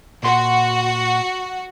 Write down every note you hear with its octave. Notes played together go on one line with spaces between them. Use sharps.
A#2 F#4 C6